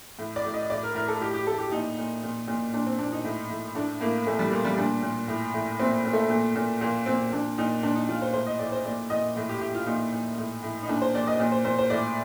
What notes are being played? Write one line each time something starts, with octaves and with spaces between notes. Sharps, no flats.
A2
D5
A2
D#5
A2 D5
A#4
A2 A#4
A4
A2 G4
G4
A2 A4
G4
A#2 D#4
A#2
A#2
A#2
A#2 D4
C4
A#2 D4
D#4
A2
A2
A2 D4
A2 A#3
A#2 A3
G3
A#2 A#3
G3
A#2 D4
A#2
A2
A2
A#2 C4
A#2
A3
A#2
A#2
A#2 A#3
A#2 C4
A#2 D4
A#2 D#4
A#2 D4
D#4
A#2 F4
C5
A2 C5
D#5
A2 D5
C5
A#2 D5
A#2 D#5
A2
G4
A2 G4
F4
A#2 D#4
A#2
A2
A2
D#4
A#2 D4
C5
A#2 D5
D#5
A#2
C5
A#2 C5
C5
A2 D5